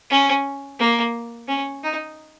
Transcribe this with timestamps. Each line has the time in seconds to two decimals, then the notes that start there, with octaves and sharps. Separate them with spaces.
0.10 C#4
0.79 A#3
1.48 C#4
1.84 D#4